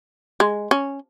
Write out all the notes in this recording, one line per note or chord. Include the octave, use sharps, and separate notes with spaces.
G#3
C#4